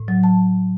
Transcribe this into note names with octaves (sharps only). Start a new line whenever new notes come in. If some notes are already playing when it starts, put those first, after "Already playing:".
Already playing: A2
F#3
A5